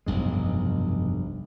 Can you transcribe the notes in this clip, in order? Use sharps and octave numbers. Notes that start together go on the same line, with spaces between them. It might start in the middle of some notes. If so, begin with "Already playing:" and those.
F1 B1 G2 G#3